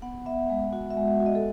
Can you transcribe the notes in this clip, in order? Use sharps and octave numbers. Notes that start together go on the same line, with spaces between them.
B3 F#5
B3 E5
G#3
F#4 F#5
E5
G#3
E5
F#4
D#5
A4